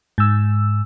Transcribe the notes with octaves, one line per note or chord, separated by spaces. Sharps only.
G#2 E6